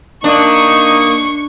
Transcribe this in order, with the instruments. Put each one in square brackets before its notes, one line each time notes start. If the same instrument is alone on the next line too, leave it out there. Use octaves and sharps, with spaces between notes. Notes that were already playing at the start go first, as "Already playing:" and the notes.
[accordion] A#3 D#6 [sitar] D4 [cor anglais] D#4 [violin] C#6